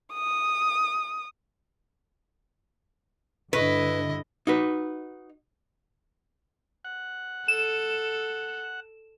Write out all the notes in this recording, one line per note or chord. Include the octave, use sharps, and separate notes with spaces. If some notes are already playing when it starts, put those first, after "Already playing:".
D#6
G2 D3 E4 B4 D#5
D#4 F#4 B4
F#5
A4 E7